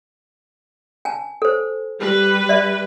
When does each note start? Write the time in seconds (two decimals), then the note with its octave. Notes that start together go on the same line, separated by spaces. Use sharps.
1.05 G#5 A5
1.42 A4 C5
2.01 G3 B4
2.49 D5 E5